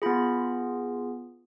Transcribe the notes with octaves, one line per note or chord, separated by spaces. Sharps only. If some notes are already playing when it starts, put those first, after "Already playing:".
B3 F4 G#4 B5